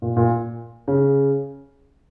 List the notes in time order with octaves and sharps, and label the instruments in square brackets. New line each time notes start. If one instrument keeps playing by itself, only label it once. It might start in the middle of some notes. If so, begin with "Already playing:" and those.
[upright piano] A#2
A#2
C#3